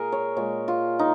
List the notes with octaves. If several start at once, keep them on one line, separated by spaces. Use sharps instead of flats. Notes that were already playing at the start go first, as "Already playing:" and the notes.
Already playing: A#2 G#4 A#4
C#5
A#2 G#3 C#5
F4
D#4